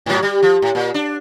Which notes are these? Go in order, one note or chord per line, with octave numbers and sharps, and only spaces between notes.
G#2 F#3
G3
F3
A2
A#2
D4